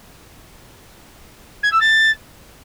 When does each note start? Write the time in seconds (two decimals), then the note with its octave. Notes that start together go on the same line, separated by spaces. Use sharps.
1.63 G#6
1.72 E6
1.80 A6